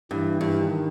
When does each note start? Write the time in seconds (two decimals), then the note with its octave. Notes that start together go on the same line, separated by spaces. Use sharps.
0.11 G2 E3
0.41 G2
0.56 D#3